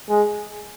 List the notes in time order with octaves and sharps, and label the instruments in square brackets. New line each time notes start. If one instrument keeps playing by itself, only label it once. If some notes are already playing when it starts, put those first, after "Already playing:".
[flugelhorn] G#3